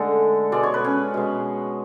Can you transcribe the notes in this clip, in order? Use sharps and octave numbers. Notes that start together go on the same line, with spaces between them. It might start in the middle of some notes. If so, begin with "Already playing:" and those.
Already playing: D3 G#3 A3 A4
B2 G#3 D5
C#5
B4
C#4 C#5
B2 G#3